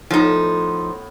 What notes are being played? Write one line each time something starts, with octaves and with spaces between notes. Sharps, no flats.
A2 F3 B3 D#4